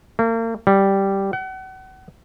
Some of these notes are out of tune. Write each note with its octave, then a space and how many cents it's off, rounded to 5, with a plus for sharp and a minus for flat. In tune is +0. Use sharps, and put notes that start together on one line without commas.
A#3 -40
G3 -5
F#5 +35